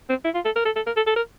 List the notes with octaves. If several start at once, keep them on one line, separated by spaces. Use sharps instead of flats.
C4
E4
F4
A4
A#4
A4
A4
A#4
A4
A4
A#4